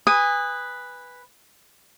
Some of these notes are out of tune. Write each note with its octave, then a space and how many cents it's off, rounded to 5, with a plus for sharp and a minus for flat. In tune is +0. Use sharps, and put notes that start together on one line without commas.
B4 +0 G#5 -30 D#6 +0